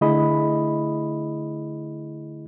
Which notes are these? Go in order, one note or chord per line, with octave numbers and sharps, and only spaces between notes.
D3 A3 E4 G#4 D#5 B5